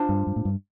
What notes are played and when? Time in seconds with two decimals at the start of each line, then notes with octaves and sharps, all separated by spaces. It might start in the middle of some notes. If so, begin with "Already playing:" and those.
Already playing: D4 F4 C5
0.09 G2
0.27 G2
0.36 A2
0.45 G2